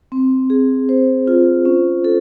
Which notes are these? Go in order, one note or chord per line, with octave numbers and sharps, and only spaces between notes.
C4
G#4
C5
F4
C#4
A4